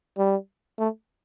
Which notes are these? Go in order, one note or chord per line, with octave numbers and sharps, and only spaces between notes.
G3
A3